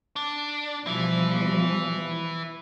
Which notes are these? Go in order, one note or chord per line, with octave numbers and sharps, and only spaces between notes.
D4
B2 E3 F3 G3 E4